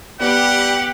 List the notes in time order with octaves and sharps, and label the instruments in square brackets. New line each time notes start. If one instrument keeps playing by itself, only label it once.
[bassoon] G3 [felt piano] B3 [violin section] G4 [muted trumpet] F#5